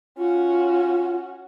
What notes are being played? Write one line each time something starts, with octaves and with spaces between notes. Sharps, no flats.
C#4 F4 F#4